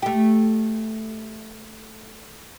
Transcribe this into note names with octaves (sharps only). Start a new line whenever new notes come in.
A3 G4